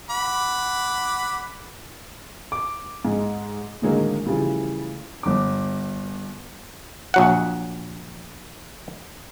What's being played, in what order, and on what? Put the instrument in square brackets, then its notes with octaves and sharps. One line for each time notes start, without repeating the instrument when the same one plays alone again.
[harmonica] F#5 B5 D6
[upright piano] D6
G#2 G#3
A2 D3 D#3 F#3 G#3 A#3
C#3 E3 F3 G3 A3
[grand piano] G1 D6
[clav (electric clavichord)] A#1 F#3 F#5